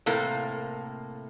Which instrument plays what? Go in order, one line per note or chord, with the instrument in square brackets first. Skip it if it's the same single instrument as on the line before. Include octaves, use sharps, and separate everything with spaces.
[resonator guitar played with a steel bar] A2 C3 A#3 A4